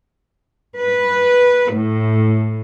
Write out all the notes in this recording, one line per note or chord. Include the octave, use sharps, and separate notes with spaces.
B4
A2